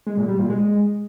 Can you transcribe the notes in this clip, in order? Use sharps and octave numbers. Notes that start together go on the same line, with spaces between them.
G#3
A#2
G3
A#2
G#3